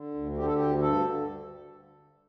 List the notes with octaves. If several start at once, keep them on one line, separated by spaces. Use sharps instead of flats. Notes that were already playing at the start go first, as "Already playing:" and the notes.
Already playing: D3
D2
D3 G4
A4
G4
D2
G2 A4
D3